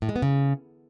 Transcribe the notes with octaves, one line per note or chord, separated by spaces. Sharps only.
A2
G#3
B3
C#3